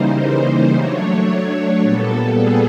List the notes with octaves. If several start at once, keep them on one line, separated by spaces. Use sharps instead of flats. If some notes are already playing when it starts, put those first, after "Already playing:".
Already playing: C#3 E3 G3 A#3 D#4 C5
C5
F#3 A3 D4 C#5
C#5
A#2 G3 B3 A4
G#4